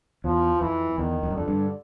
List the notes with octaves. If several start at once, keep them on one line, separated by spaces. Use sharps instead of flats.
E2 F3
F2 E3
E2 D#3
F2
F#2
F2 D3
G2